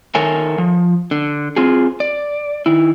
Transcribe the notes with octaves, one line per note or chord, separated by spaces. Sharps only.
D#3 A4 A#4 C#5 E5 G#5
F3
D3
C4 F4 G#4
D5
D#3 E4